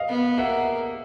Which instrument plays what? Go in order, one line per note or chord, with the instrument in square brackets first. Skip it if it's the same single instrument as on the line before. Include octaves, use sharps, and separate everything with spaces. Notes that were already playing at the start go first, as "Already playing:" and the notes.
Already playing: [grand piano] D#5 F5
[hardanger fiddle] B3
[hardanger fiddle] A#3 [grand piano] E5 F#5